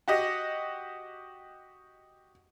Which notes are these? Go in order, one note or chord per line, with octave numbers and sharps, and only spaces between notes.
F#4 G4 D#5 F#5